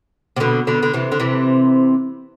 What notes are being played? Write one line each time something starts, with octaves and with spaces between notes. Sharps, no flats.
C3
B2 D3
B2 D3
D3
C3 E3
D3
C3 E3